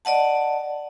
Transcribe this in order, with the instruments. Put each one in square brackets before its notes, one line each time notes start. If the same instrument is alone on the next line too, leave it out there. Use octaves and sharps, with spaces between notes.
[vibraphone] D5 D#5 F#5 A5